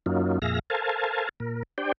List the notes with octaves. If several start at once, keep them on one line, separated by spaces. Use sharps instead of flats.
F#2 F#3 A#3 C#4 D#4 F4
F2 A#2 G#4 E5 F5 A#6
A4 A#4 C5 F5 G#5 A5
A#2 A#4
D4 G4 C5 D5 G5